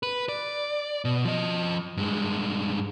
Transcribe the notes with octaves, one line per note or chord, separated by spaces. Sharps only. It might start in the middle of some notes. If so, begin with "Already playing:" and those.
B4
D5
B2
F3 D#5
G2 G#3